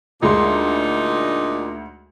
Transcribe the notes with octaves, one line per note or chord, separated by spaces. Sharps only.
D2 A#2 G#3 D4 D#4 C6